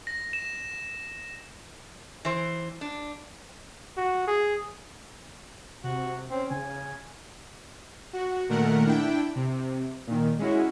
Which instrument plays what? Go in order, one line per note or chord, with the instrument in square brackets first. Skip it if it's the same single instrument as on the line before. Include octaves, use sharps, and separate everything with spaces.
[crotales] A#6
E7
[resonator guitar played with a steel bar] E3 C5
D4
[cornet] F#4
G#4
[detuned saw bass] C3 [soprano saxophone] F#4
[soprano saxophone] C4 [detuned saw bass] C#4
[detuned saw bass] C#3 [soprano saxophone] G#5
[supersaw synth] F#4
A#2 D#3 A3 A#4 F#5
D4 E4 G5
C3
A#2 D#3
G#3 C#4 E4 F#4